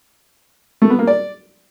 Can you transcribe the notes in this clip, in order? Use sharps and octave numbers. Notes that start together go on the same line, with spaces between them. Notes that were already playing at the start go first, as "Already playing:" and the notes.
A3
B3
A#3
D5